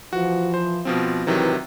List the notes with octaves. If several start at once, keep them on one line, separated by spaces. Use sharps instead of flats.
E3 F3 F#4
C5
B2 F3 C4
C3 D#3 E3 F#3